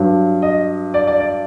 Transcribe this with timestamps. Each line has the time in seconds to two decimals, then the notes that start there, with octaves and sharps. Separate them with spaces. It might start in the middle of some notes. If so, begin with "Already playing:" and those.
Already playing: G2 F#3
0.42 D#5
0.94 D5
1.07 D5
1.20 D5